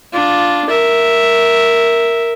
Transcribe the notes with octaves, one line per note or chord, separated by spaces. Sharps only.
D4 F4
A#4 E5